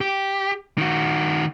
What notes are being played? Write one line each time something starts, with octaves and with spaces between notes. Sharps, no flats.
G4
D#3 F#4